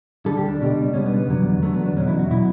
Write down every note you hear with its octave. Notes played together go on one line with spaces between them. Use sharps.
D2 D3 G3 A4
G4
D4
C#2 B2 G3
C#2 B2 G3 C#4
B3
B3
E2 D3 F#3
E2 D3 F#3 A3
B3
D4
E2 B2 F#3 C#4
E4
F#4
B2 F#3 E4